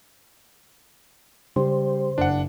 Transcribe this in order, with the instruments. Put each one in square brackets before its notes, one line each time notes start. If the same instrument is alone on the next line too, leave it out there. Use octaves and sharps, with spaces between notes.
[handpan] C#3 [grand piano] G3 [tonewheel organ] C5
[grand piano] F#1 [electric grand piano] D4 F#5